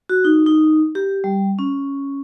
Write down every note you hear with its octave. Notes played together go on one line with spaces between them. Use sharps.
F#4
D#4
D#4
G4
G3
C#4